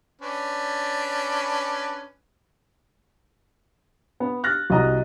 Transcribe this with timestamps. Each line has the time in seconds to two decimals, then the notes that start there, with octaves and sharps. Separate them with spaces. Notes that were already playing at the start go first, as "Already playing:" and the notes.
0.21 C#4 D4 B4
4.20 B3
4.44 F6 F#6 A6 A#6
4.70 C2 F#4 D#5 A#5